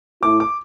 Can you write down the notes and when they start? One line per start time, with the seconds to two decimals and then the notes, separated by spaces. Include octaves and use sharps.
0.23 A2 A3 E4 D6
0.40 D6